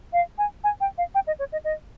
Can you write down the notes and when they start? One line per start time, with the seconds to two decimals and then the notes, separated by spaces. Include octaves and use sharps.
0.13 F5
0.38 G#5
0.64 G#5
0.81 G5
0.98 F5
1.15 G5
1.27 D#5
1.39 C#5
1.52 D#5
1.64 D#5